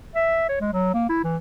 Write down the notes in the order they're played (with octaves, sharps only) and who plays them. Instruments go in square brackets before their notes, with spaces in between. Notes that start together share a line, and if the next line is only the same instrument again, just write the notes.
[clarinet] E5
C#5
G#3
F#3
A#3
E4
E3